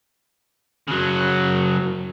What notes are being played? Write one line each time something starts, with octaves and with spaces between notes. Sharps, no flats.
C#3 F#3